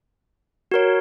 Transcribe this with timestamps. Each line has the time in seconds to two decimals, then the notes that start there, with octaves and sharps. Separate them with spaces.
0.72 F#4 A#4 C#5